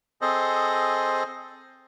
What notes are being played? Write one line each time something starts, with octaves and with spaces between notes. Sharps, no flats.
C4 G#4 A4 C5 D#5